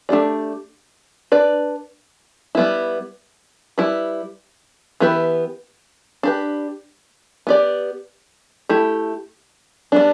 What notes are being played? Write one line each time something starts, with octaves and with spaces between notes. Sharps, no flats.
A3 D4 G4 D5
D4 B4 D5
G3 B3 E4
G3 E4 B4
E3 B3 E4 G4 B4
D4 G4 B4
B3 G4 D5
A3 E4 G4
G3 B3 D4